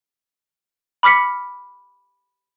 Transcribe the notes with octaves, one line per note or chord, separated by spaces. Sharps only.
B5 D6 F6 B6 C#7